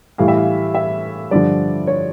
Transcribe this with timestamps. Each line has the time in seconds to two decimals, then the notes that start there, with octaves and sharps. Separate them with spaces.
0.18 A2 E3 G3 F5
0.28 E5
0.37 F5
0.75 E5
1.31 G2 D3 F3 D5
1.87 C#5